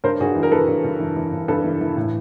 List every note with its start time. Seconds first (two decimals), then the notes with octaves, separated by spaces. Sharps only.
0.04 G2 A#4 C5
0.20 G2 F#4 G#4
0.36 E3
0.43 A#4
0.52 E3 A4 B4
0.68 G2
0.84 G2
1.00 E3
1.16 E3
1.32 G2
1.48 G2 A4 B4
1.64 E3
1.81 E3
1.97 A2